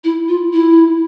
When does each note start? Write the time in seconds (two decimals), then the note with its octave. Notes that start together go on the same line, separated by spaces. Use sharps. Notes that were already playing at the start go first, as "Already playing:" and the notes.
0.04 E4
0.29 F4
0.54 E4